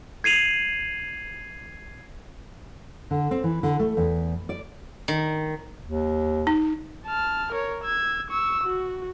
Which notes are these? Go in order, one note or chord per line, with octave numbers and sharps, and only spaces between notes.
G#6 C7 D#7 F7 F#7
D3
C4
E3
D3
A3
E2
D5
D#3
D#2
D#4
A5 F6
A#4 C#5
E6 G#6
C#6 E6
F#4